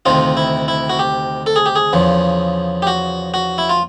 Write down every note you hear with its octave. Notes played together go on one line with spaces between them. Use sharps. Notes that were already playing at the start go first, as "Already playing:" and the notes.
D2 C3 D#3 F4
E4
E4
F#4
G4
A4
G#4
G4
G#4
E2 C#3 F3
G4
F#4
F#4
E4
F4